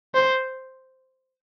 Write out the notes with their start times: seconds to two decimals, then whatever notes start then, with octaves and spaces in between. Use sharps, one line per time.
0.15 C5